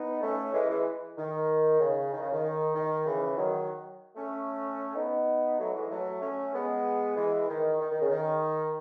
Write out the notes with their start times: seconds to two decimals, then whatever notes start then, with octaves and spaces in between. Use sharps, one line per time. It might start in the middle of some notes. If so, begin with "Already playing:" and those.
Already playing: B3 D#4
0.21 A3 C#4
0.53 E3 G#3
0.69 E3 G#3
1.17 D#3
1.80 C#3
2.12 D#3
2.21 C#3
2.32 D#3
2.75 D#3
3.06 C#3 E3
3.37 D#3 F#3
4.16 A3 C#4
4.95 B3 D#4
5.59 F#3 A3
5.74 E3 G#3
5.90 F#3 A3
6.21 A3 C#4
6.53 G#3 B3
7.16 E3 G#3
7.48 D#3
7.80 D#3
7.91 D#3
8.01 C#3
8.11 D#3